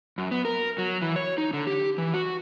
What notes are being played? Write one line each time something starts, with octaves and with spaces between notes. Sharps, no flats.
F#2
B3
A#4
F#3
E3
C#5
D#4
D3
G4
E3
F#4